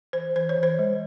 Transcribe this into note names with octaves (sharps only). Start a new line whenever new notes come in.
E3 C5
E3 C5
C#5
E3
C5
G#3